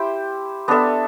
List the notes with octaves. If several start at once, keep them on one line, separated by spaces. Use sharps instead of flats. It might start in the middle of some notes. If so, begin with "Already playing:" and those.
Already playing: E4 G4 C5
B3 D4 A4 E5